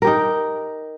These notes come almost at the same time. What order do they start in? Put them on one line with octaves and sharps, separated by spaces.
A#4 G4 D#4